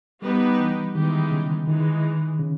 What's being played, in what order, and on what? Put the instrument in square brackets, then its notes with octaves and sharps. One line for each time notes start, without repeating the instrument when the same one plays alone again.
[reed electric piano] G3 [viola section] B3 D#4 G4 B4
[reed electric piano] E3
[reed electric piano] D#3 [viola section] E3 G#3 B3 D#4 G4
[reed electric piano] C#3
[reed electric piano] D#3 [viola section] E3 G#3 D#4
[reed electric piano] C#3